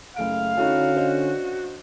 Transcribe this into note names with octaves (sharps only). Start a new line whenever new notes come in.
F#1 A3 F5 D7
D3 C#4 D#4 E4 F#4 A4
D4 C5 D#5